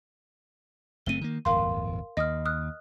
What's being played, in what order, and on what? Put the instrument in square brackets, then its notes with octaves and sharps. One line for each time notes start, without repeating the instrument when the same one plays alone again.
[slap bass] F#1 A3 C4 [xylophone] D#7 G7
[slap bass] D#3 A#3
[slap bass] D1 G1 E2 [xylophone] A#4 F5 C6
[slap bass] D#2 [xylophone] D#5 D#6 F6
[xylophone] D#6 F6 F#6